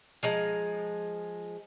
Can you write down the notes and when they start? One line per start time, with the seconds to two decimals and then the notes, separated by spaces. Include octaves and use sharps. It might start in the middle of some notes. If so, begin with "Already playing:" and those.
0.23 F3 G#3 A#5